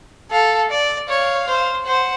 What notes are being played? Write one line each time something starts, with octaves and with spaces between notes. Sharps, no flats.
A4 F5
D5
C#5 F5
C5
C5 F#5